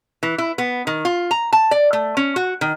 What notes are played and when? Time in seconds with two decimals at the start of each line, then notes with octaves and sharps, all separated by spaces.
0.23 E3
0.38 E4
0.58 B3
0.87 D#3
1.05 F4
1.31 A#5
1.53 A5
1.71 D5
1.93 A3
2.17 C#4
2.36 F#4
2.61 D#3